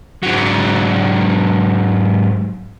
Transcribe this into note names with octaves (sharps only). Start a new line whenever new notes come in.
G#2 F#3